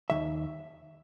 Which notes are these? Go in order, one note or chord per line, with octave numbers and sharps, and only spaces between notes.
D#2 D#3 E5